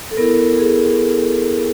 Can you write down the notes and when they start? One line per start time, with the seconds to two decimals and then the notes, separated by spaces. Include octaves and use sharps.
0.11 A4
0.17 B3 E4 A#4
0.59 G#4